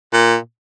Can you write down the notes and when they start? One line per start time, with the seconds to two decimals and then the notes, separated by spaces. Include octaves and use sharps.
0.13 A#2